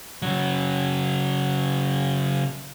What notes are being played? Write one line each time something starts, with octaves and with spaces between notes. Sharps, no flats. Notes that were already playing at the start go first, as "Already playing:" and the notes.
C#3 F#3